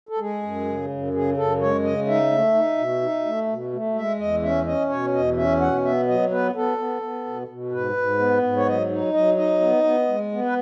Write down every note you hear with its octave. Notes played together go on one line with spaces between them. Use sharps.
A4
G#3 G#4
F#2
C#3
F#2
C#3 G#4
F#2 A4
G#3 C#5
C#3 D#5
D#4 E5
A3
D#4
B2
D#4
A3
B2
A3
G#3 E5
E2 D#5
C#4 E5
C#4 D#5
B2 C#5
E2 D#5
C#4 E5
B2 F#5
B3 E5
F#3 D#5
B3 B4
B3 A4
B3
B3
B2
B2
G#2 B4
G#2
B3
G#2
C#5
F#3 D#5
D#4
F#3 D#5
D#4 D#5
B3
B3
G#3
B3
B4